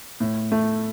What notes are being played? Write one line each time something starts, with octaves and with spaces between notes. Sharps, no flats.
A2
A3